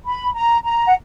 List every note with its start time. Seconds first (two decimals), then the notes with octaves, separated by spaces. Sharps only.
0.05 B5
0.34 A#5
0.63 A#5
0.86 F#5